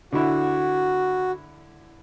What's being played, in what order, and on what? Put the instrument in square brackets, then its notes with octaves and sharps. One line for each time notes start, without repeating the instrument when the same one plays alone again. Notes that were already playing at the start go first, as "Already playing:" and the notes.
[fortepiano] D3 E4 [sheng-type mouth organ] F#4